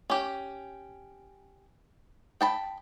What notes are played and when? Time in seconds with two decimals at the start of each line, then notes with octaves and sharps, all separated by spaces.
0.10 C#4 G4
2.41 G5 A5 B5